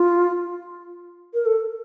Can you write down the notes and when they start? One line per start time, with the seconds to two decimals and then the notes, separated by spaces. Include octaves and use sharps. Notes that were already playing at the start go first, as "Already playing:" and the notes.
Already playing: F4
1.34 A#4
1.46 A4